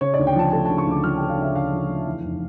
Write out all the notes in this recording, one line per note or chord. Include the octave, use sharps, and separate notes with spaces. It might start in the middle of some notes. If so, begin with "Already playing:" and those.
C#3 C#5
D5
D2
G5
F3 A5
A3 A5
C#3 A5
C#6
D2 D6
F3 F6
A3 G5
F5
C#3 E5
D2 F5
F3
A3
E2
F1